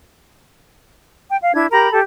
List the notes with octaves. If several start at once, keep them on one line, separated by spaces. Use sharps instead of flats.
G5
F5
D4 E4 G#6
G4 A#4 A#5 B5
G4 A4